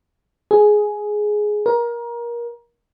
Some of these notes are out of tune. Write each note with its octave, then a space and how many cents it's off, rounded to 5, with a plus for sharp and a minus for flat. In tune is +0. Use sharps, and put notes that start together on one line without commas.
G#4 +10
A#4 +25